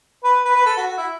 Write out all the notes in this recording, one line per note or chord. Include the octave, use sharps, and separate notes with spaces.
B4
B4
B4
A4
F#4
F#4
E4